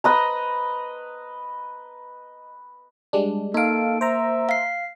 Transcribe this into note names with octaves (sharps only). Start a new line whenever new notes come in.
B4 D#5 A#5
G3 G#3 D4
A#3 D#4 A4 F5 D7
C5 E5 A#5
F5 C7